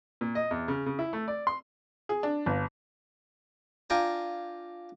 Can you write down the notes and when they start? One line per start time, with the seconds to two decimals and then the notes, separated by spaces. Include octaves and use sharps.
0.21 A#2
0.35 D#5
0.51 E2
0.68 C#3
0.86 C#3
0.99 E4
1.13 A3
1.28 D5
1.47 C6
2.09 G#4
2.23 D4
2.46 G1
3.90 D4 F4 G5 G#5 A#5